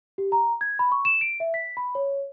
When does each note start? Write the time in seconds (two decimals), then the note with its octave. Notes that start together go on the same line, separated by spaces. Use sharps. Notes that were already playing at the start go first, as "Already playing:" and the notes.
0.18 G4
0.32 A#5
0.61 G#6
0.79 B5
0.92 C#6
1.05 E7
1.21 D7
1.40 E5
1.54 B6
1.77 B5
1.95 C#5